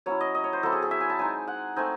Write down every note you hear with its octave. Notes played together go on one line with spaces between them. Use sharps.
F#3 C#4 E4 C#5
D#5
D#5
C#5
C5
F#3 C4 E4 A4
G#4
G#4
E5
G#5
A5
G#3 D#4 G#5
F#5
A3 C4 D#4 G#5